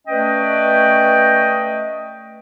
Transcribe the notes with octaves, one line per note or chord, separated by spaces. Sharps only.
A3 C#4 B4 D5 D#5 G5